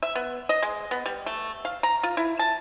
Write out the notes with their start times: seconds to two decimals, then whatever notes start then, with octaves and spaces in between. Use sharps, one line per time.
0.03 E5
0.16 B3
0.49 D#5
0.63 G#3
0.91 B3
1.06 G3
1.26 A3
1.65 F5
1.83 A#5
2.03 F4
2.17 E4
2.39 A5